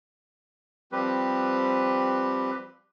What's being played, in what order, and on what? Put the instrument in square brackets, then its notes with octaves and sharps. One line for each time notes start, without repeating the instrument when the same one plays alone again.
[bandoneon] F3 G3 C4 G4 B4